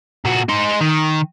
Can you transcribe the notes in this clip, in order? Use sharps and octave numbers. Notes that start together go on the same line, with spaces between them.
A#2 F#4
D#4 C5
D#3